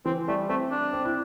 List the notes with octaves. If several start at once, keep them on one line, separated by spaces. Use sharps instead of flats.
E3 C4
G3 A3
A3 C4
D4
C4
E4